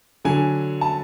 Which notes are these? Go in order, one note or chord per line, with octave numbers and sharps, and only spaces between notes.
D3 F#3 G#5
A5